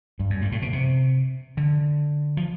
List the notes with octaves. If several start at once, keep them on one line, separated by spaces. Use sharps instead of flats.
G2
F#2
G2
A2
B2
C3
D3
F3